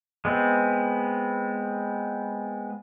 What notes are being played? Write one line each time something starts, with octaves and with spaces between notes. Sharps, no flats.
G#3 B3 C4